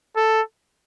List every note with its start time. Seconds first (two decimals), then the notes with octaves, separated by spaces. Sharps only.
0.16 A4